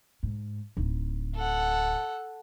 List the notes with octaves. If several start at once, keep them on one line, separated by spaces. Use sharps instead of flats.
G#2
D1 D#4
A4 F#5